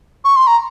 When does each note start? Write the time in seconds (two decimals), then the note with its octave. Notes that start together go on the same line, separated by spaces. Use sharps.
0.25 C#6
0.36 C6
0.47 A#5